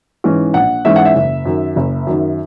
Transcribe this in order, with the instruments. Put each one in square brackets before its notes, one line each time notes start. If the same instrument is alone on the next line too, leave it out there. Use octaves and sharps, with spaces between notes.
[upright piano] G#2 E3 G#3 C#4
A#1 F#5
G#2 E3 G#3 C#4 E5
F#5
E5
F#1
F#2 D#3
F#1
F#2 D#3